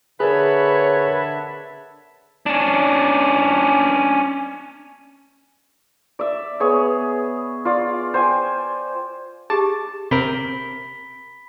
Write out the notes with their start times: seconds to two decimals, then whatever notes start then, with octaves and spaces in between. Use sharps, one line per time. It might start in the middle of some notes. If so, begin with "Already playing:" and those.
0.20 D3 G#4 A#4 B4 C#5 E5 A5
2.46 C#4 D4
6.19 D5 E5
6.60 B3 G#4 C#5
7.65 F4 D5
8.14 C5 G5 G#5
9.50 G4 G#4 A5
10.11 C3 C4 A#4 B5 B6 G7